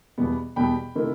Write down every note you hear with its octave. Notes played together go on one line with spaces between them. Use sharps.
E2 B2 G3 B3
E2 B2 G3 B3 G5 B5
C3 D#3 A3 E4